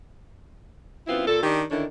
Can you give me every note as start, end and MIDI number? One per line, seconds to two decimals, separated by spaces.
1.07 1.24 42
1.07 1.24 59
1.07 1.24 60
1.07 1.24 64
1.07 1.24 65
1.27 1.43 46
1.27 1.43 69
1.43 1.63 51
1.43 1.63 62
1.43 1.63 67
1.71 1.84 50
1.71 1.84 51
1.71 1.84 61
1.71 1.84 62
1.71 1.84 64